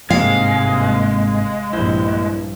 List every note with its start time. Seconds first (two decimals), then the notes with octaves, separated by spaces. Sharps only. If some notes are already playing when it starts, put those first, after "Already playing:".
0.10 G1 G#2 C3 G#3 A#3 C4 F5
1.73 A#1 G2 G3 E4 C5